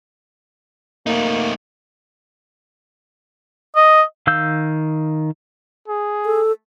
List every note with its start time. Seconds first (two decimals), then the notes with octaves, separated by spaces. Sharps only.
1.07 A3 A#3 D#4
3.76 D#5
4.27 D#3 F5 E6 G6
5.88 G#4
6.25 A4